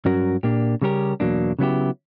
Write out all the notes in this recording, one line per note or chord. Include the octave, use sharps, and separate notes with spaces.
G2 F#3 C#4 F#4 A#4
A#2 A#3 D4 G4
C#3 G3 C#4 G4 A#4
E2 B2 F#3 A#3 D4
C#3 F#3 B3 E4 G4